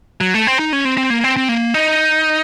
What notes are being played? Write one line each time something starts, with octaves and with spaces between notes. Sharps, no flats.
F#3
A3
C4
D#4
C#4
C4
C4
A#3
C4
C4
A#3
D#4